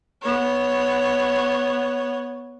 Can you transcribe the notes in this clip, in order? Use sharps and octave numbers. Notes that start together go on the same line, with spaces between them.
B3 C#5